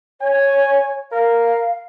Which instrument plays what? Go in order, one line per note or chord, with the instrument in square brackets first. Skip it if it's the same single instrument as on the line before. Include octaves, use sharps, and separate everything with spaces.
[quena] C#5 [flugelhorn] G#5
[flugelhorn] A#4 [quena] F5